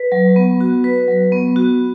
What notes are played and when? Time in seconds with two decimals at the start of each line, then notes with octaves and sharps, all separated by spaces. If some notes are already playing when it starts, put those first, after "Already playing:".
Already playing: B4
0.12 F#3
0.36 B3
0.61 F#4
0.84 B4
1.08 F#3
1.32 B3
1.56 F#4